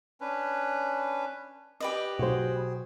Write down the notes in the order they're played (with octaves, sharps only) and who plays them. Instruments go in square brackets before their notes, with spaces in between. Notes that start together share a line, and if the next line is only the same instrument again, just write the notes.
[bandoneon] C#4 D4 B4
[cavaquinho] G4 B4 D#5 [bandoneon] D5
[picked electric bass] B2 F#3 [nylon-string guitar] F#4 C5 [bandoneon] G#4